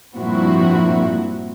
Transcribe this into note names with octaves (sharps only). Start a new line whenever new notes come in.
G2 A#2 F3 C4 E4 F#4